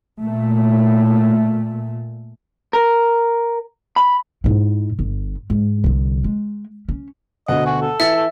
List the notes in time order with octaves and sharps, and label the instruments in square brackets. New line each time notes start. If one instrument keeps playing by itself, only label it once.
[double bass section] A#2 A3
[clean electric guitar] A#4
B5
[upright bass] G#2 E4
G1
G#2
C2 D3
G#3
C#4
[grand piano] D2 B2 D3 [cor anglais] D#5 [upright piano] F#5
[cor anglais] F#4 [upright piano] F#5 G#5
[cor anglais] A4
[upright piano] E3 [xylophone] E5 [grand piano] E6 A6 C#7
[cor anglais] A4